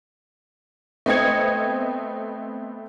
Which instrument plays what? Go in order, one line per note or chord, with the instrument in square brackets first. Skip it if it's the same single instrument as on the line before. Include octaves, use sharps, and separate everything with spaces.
[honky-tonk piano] A3 B3 C4 D#5 G#6 C#7